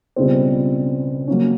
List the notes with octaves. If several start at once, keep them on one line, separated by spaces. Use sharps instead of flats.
C#2 B2 G3 C4
F#3 A#3 C#4